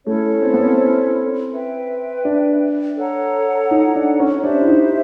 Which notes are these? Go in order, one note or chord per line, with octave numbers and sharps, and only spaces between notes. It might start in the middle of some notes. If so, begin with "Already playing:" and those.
A3 C#4 E4 A4 C#5
C4
B3
C4
B4 E5 G5
D4
A4 C#5 F#5 A#5
D#4
D4
C#4
D4 G4 C5 E5
E4
D#4